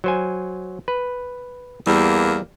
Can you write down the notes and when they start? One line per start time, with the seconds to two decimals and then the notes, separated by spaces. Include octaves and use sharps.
0.04 F#3 C5 G#5
0.88 B4
1.87 E2 G3 A#3